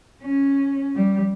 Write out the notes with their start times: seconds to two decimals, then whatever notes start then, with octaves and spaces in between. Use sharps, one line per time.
0.23 C#4
0.96 G3